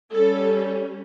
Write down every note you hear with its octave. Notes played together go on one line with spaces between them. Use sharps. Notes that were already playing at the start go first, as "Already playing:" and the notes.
G3 C#4 A4